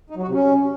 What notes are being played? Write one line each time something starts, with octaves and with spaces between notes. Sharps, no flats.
D#4
F#3
F#4
C3
C#4